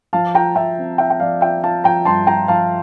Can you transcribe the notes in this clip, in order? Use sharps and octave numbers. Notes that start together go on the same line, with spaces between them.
F3 F5 A5
F4 G5 A#5
F3 E5 G5
C4
F4 E5 G5
G5
F3 D5 F5
F4 E5 G5
F4 F5 A5
F3 G5 A#5
G2 A5 C6
F4 G5 A#5
F3 F5 A5